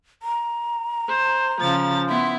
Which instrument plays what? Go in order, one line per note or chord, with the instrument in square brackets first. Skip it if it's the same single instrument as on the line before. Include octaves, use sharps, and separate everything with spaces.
[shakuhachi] A#5
[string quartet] C5
C#3 F3 A6
[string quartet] B3 E4 [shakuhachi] C6